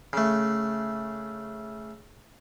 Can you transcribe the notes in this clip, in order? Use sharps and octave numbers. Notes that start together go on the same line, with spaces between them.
C#3 A3